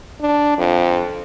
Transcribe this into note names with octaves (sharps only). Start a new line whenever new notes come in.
D4
F2